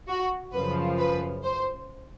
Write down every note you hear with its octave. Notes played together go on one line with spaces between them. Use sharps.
F#4
F#2 C#3 F3 B4
B4
C5